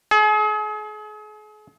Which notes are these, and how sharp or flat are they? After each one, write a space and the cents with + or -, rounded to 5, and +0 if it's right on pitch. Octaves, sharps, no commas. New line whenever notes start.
G#4 +40